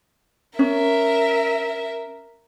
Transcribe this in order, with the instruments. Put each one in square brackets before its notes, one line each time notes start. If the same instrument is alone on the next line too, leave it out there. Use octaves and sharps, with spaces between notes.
[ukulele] C#4 [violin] A#4 E5